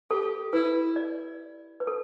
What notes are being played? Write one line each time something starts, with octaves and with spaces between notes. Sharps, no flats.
G4 A4
E4 B4
D5
B4
A4